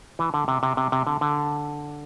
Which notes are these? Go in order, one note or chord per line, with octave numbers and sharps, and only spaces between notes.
E3
D3
C3
C3
C3
C3
D3
D3